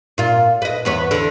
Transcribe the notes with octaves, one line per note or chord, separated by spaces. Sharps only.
A#2 F4
B4 D#5
E2 B3 C#5
E2 D3